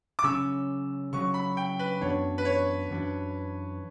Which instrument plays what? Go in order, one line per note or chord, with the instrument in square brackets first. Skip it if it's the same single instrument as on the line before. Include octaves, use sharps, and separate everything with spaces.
[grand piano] D6
[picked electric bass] C#3 F#3 C#4 [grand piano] E6
[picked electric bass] C#3 F#3 C#4 [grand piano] C#6
[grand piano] B5
G5
B4
[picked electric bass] F#2 E3 B3 D4 [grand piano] C#5
[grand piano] B4
C#5
[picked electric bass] F#2 E3 B3 D4